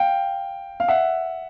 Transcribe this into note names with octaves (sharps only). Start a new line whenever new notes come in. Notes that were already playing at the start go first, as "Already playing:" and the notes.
Already playing: F5 G5
F5
E5 F#5